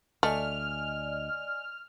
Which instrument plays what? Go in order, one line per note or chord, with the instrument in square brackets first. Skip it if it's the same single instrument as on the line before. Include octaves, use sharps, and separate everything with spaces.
[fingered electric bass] D2 [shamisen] A3 [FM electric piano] D5 D#5 G#5 [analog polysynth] F6